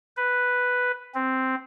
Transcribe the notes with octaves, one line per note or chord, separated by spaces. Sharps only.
B4
C4